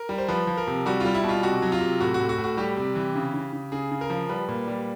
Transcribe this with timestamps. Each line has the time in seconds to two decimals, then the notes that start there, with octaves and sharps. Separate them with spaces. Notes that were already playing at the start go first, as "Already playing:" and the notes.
Already playing: A#4
0.09 G3
0.18 C5
0.28 F3 B4
0.47 F3
0.57 A#4
0.67 C3
0.86 G3 F#4
1.00 G3 F4
1.14 E4
1.24 B2
1.29 F4
1.43 C3 F#4
1.62 F#3
1.72 F4
1.81 C3
2.00 A2 F#4
2.14 F#4
2.20 A2
2.29 F#4
2.38 A2
2.44 F#4
2.57 G3 G4
2.77 C3
2.95 E3
3.15 C#3
3.34 C#3
3.53 C#3
3.72 C#3 G#4
3.91 C#3
4.01 A#4
4.10 F3
4.29 G3 B4
4.48 A#2
4.68 G3